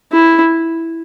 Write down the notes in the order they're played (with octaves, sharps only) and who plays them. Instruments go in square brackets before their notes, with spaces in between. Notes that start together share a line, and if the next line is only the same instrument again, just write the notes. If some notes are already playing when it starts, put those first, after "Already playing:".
[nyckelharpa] E4